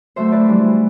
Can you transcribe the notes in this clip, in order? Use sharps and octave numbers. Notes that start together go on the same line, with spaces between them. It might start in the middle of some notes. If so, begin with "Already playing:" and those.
D3 F#3 A3 C5 E5
B4 D5
E3 G3 D4